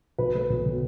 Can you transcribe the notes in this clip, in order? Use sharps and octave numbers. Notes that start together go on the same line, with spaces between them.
B1 B4 B5
A3
B1
B2